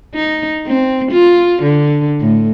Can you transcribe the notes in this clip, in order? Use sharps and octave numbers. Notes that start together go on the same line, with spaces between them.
D#4
C4
F4
D3
A2